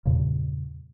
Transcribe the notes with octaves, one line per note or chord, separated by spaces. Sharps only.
E2 G2 A#2 C#3